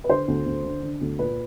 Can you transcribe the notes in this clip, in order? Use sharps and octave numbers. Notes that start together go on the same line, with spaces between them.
B4
D3 C5
D2
D2
D3
D3
D2
A#2 B4